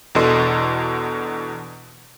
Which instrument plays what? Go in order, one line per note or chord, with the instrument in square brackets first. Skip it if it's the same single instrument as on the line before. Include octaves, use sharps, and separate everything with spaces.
[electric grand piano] E2 B2 D4 A4 D#5 C6